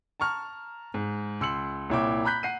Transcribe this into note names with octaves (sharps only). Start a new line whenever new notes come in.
A5 A#5 C#6 F6
G#2
C#2 C6 E6 C#7 F#7
C2 A#2 E4 C#5 G5 D6
A#5 B5 F#6 G6 B6
F#5 C7 D#7